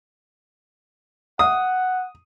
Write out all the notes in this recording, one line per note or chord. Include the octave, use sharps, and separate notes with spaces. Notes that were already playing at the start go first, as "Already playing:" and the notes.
F#5 D#6